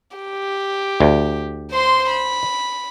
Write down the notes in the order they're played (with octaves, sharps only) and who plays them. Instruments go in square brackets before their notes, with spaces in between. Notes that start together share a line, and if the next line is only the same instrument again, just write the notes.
[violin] G4
[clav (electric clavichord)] D2
[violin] C5 C6
B5